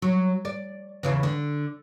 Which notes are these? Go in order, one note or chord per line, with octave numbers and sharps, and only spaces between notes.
F#3
D5
E2 C#3 E3
D3